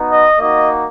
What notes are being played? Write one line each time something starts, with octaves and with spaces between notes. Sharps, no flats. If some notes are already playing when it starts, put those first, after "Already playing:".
Already playing: B3 D#4 F#4
D#5
A#3 D#4 F#4 D#5